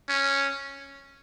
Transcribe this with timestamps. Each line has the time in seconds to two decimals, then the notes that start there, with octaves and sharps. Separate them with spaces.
0.09 C#4